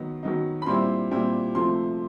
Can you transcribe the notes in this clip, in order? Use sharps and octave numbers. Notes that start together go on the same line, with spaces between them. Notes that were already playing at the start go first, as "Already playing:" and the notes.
Already playing: D#3 F#3 B3 D#4
D#3 F#3 B3 D#4
B5
A#2 G3 C4 E4 C6
A#2 G3 C4 E4
C3 F3 A3 C6